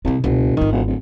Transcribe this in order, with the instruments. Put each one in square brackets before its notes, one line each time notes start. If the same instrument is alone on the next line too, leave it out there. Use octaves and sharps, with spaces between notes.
[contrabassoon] C2 [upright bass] C3 G#3
[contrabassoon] F#1 [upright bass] C#2 B2
[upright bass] G#1 F4 [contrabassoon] D#3
[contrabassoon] E1
D1